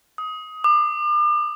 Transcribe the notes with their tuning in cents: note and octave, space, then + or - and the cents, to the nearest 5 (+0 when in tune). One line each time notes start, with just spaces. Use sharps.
D#6 +20
D6 +40